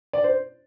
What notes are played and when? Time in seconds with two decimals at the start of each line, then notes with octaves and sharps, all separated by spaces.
0.13 D5
0.24 C5